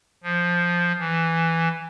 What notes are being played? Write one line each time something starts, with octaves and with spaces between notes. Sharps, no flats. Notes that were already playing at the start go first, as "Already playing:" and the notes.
F3
E3